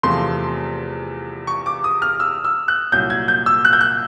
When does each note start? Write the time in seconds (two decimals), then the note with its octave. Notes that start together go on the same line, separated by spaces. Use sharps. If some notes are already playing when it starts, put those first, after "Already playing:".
0.03 E2 C3 F3 A3 C6
1.47 C#6
1.66 D6
1.84 D#6
2.02 F6
2.20 E6
2.45 E6
2.68 F#6
2.92 C2 A#2 F#3 G6
3.10 G#6
3.28 G6
3.46 E6
3.65 F#6
3.73 G6
3.81 F#6